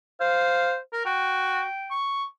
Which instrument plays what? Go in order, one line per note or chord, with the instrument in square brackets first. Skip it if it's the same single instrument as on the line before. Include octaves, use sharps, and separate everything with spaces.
[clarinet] C5 [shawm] F5
[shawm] A#4
[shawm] F#4 [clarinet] G5
[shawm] C#6